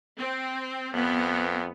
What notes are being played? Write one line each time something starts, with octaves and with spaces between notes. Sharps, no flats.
C4
F2 B3